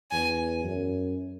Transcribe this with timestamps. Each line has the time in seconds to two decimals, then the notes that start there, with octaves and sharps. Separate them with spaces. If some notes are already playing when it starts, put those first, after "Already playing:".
0.11 E2 G#5
0.64 F#2